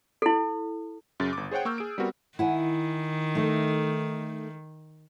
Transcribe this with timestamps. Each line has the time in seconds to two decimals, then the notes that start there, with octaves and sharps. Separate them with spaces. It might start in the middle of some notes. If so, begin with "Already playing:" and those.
0.22 E4 A4
1.20 F#2 C#3 A6
1.33 G1 D6
1.51 G#4 C5 C#5 F#5 G5
1.65 A#3 C#6 E6 F6 G6
1.78 G#4 D7
1.98 G3 B3 C4 F#4 A#4
2.39 D#3 E4 F#5 G#5
3.35 A3 D#4 A4